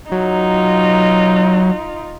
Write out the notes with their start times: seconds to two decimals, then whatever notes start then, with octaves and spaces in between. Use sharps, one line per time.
0.12 F#3 D#4 F4